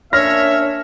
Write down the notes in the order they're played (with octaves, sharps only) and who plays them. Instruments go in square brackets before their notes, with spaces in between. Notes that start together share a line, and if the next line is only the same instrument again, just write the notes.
[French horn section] A#3 C#4 D4 [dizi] C#5 [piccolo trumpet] E5 [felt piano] F6 A#6